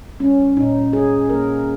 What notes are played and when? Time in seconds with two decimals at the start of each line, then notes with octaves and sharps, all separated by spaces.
0.20 G3 C#4
0.57 A#2 D#4
0.93 A#2 G#4
1.29 A#3 A#4